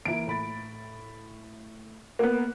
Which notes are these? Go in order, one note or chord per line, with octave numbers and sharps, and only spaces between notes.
E3 A#3 E4 D7
A2 B5 A6
A#3 B3 F#5 F#6